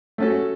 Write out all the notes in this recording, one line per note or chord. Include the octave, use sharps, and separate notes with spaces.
A3 C#4 F#4 A4